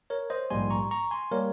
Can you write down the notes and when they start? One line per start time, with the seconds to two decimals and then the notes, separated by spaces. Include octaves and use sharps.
0.10 A#4 C#5
0.30 C5 D#5
0.50 A#1 G#2 G3 A#3 G#5 C6
0.70 A#5 C#6
0.91 A#5 C#6
1.11 G#5 C6
1.31 G3 A#3 A#4 C#5